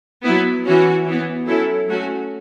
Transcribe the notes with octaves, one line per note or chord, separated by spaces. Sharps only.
F#3 B3 E4
E3 C#4 F#4
E3 B3
F#3 C#4 E4 A4
F#3 A3 C#4 F#4